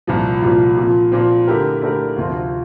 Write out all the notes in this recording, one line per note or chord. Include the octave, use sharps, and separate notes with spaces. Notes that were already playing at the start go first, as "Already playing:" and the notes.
C2 A#2 F3
C2 A#2 F3
A#2 F3 C4
A#2 F3 C4
D3 A3 E4 G4 A#4
D3 A3 E4 G4 A#4
D2 C3 F3 C4 F4